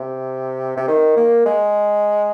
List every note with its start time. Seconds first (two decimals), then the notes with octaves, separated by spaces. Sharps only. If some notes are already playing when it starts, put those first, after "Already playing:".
Already playing: C3
0.77 C3
0.88 D#3
1.16 A#3
1.46 G#3